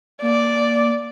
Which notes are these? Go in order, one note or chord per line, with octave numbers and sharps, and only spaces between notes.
A#3 D5